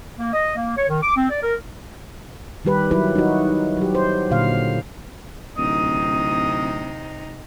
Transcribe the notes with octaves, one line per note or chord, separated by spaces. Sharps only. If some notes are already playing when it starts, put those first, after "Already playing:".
A#3
D#5
A#3
C#5
D#3
D6
C4
D5
A#4
D#3 G3 G4 B4
F#3 E4 B4
D#4 F#4
F#3 G4
C5
A#2 D3 F5
D1 C3 D#4 D#6